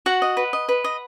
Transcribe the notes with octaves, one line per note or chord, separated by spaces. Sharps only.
F#4 F#5
D#5
B4
D#5
B4
D#5